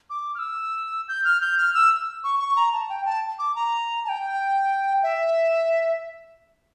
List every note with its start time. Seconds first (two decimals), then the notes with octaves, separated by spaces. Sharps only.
0.10 D6
0.35 F6
0.39 E6
1.08 G6
1.25 F6
1.41 G6
1.58 F6
1.74 E6
2.24 C#6
2.39 C#6
2.56 A#5
2.73 A5
2.89 G5
3.05 A5
3.39 D6
3.55 A#5
4.04 A5
4.09 G5
5.03 E5